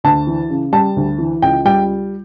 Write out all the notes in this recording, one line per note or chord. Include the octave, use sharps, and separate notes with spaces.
D2 A5
E3
C#3
G3 A5
D2
E3
C#2 G5
G3 G5